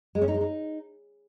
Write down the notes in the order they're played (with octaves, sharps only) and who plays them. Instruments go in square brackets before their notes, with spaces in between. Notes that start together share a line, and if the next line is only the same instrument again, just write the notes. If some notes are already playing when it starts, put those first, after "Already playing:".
[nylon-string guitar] G#3
C#4
D#4
G#3
D#4